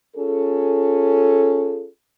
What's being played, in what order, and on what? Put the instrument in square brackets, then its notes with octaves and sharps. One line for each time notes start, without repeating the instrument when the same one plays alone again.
[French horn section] C#4 F4 G#4 A4